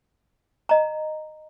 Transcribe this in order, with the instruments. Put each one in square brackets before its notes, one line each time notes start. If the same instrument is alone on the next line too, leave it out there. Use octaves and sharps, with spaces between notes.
[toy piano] D#5 A#5